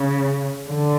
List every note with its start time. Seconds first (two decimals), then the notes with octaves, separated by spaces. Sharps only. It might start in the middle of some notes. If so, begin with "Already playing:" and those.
Already playing: C#3
0.67 D3